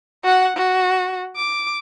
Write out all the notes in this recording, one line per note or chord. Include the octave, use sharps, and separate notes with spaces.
F#4 F#5
F#4
D6